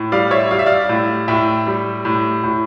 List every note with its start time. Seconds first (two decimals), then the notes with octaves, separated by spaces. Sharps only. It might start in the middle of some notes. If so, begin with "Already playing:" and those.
Already playing: A2
0.12 G3 D5 F5
0.31 C#5 E5
0.51 G3 F5
0.59 E5
0.66 D5 F5
0.89 A2
1.28 A2 E5 G5
1.67 G3
2.05 A2
2.44 A2